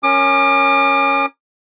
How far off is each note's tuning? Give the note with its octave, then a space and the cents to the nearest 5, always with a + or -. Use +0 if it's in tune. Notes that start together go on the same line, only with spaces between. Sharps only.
C#4 +0 A#4 +0 D6 +40